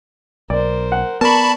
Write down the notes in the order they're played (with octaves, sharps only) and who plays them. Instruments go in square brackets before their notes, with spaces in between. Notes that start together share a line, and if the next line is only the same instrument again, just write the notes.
[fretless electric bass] B1 [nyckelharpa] A#4 C5 [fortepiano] D5
[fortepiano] F#5
[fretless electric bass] B3 [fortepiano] A#4 [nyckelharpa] D5 C#6 [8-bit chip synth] A5 B5